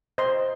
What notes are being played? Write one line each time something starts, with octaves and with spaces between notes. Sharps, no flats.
C5 D#5 C6